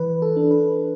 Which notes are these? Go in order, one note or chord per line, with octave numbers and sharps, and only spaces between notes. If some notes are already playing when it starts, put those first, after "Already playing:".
Already playing: E3 B4
A4
D4
B4